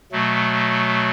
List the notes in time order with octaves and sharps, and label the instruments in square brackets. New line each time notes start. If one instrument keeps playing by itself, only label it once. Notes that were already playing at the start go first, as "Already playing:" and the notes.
[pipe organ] B2 F#3 A3